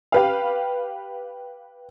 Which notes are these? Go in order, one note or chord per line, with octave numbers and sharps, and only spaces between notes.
G4 B4 F5